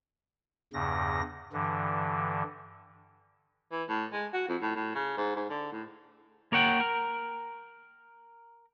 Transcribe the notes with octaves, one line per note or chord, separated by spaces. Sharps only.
E2 G2 C#3 A#6
G2 D3 E3
E3
A2
G#3
F#4
F2
A2
A2
C#3
G#2
G#2
D3
A2
A#3 A#4 C#5 F#5 G5
A#4